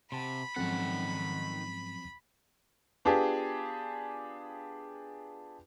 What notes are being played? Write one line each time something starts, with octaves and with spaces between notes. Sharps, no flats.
C3 F#5 A5 B5 C6
G#2 D#3 F3 F#3 C4 C#4 A4 F#5
B3 D4 F4 G4 G#4